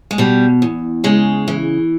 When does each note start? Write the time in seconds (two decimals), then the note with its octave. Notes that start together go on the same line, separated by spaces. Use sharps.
0.11 G#3
0.18 B2 G3
0.62 E2
1.04 C#3 G#3
1.48 E3